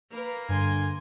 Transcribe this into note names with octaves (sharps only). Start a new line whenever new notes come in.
A#3 A#4 B4
G2 D3 G#5 C6